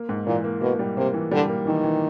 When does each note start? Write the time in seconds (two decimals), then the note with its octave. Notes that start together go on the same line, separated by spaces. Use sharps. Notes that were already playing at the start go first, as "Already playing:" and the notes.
Already playing: A#3
0.09 G#2
0.26 A#2 E3
0.44 A#3
0.61 B2 A#3
0.79 G3
0.97 C3 A#3
1.14 E3
1.31 D3 G3
1.49 A#3
1.66 D#3 E3
1.84 E3